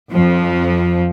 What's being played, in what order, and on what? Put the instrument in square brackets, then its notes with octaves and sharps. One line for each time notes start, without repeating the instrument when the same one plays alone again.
[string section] F2 F3